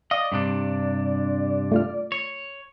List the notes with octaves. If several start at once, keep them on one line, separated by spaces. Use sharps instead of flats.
D5 D#5 F5 D6 D#6
G2 C3 D4
A3 F4 F6
C#5